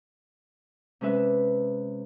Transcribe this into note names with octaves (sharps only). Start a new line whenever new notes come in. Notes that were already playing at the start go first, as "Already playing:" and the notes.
C3 G#3 C#4 B4 E5